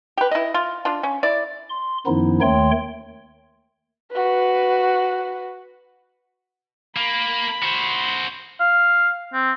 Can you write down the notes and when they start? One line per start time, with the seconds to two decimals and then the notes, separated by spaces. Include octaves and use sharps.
0.17 G4 B4
0.31 E4 D#5
0.54 F4
0.85 D4 F4
1.03 C#4
1.23 E4 D5
1.69 C6
2.06 F#2 D#3 F3 B3 D#4 E4
2.41 D#2 D#3 A3 C#5 G5 C6
4.11 F#4 B4
6.97 A#3 B5
7.63 F#4 C5
8.60 F5
9.33 C4